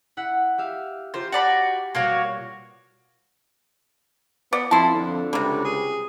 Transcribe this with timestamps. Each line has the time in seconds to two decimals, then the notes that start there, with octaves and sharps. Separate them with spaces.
0.17 E4 F#5 B6
0.58 G4 E5 F5
1.14 F4 G4 A#4 C5
1.32 F#4 D5 G5 A5 B5
1.95 B2 G3 A#3 F#4 C#5
4.53 B3 D5
4.71 F2 E4 A5 C6
4.94 F2 D3
5.33 C#2 C3 G3
5.65 G#4